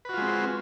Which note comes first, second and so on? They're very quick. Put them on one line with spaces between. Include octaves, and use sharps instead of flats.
B4 F#4 F4 G#3 C4